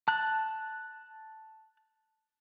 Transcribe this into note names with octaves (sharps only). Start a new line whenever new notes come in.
A5 F#6